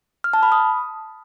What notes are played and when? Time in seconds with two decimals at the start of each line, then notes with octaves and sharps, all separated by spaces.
0.24 F6
0.33 A5
0.43 B5
0.52 D#6